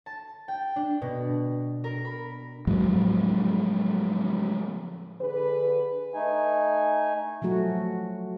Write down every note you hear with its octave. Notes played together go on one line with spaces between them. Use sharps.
A5
G5
D4
B2
A#4
B5
A2 F3 F#3 G#3
D3 G#4 B4
A3 D#4 G#5
F3 F#3 A3 F#4